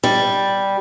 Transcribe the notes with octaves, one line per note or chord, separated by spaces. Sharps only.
G3